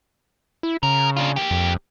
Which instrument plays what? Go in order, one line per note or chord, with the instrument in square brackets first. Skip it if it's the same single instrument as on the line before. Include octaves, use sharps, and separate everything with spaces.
[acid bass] E4
[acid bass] C#3 [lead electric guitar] A#4
[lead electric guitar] D4 F4
A#3 G4
[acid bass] F2